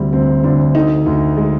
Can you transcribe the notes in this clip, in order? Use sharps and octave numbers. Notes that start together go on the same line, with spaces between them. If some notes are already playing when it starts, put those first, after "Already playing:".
Already playing: D2 C3 G3 C4
D2 C4
D2 D4
D3 D#4
D2
G#3